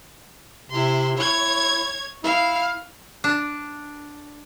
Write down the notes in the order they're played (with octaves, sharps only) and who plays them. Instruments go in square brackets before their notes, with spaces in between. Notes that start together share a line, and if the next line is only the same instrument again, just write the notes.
[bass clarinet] C3 [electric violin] E4 C6
[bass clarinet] E4 [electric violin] C#5 G#6
[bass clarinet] E4 [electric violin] F5
[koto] D4